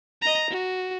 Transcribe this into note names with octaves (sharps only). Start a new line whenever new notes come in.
D#5 A#5
F#4